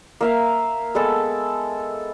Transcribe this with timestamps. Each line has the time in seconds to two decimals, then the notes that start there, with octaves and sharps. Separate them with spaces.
0.21 A#3 E5 F5
0.95 G#3 B3 A4 A5